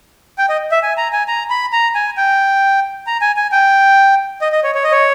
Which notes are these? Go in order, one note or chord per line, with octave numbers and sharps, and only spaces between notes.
G5
D#5
E5
G#5
A#5
G#5
A#5
B5
A#5
G#5
G5
A#5
G#5
G#5
G5
D#5
D#5
C#5
C#5
D#5
C#5